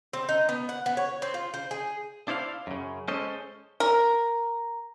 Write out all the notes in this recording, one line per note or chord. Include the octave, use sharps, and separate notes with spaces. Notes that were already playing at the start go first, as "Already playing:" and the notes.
C4
D#4
B3
F#5
B3
C#5
C4
F4
C5
G#4
D4 E4 C5 D5 F5
F#2 C#3
G#3 C#4 A4 C5 D#5
A#4